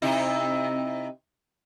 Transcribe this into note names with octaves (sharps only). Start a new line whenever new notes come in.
C3 D#4 E4